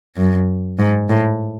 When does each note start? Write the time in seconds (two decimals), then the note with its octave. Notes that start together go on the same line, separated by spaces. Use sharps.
0.16 F#2
0.79 G#2
1.09 A2